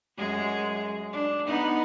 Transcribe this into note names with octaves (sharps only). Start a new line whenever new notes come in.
F#2 G#3 G#4
D4
B3 D#4